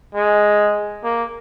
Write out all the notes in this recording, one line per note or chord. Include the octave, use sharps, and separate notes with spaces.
G#3
A#3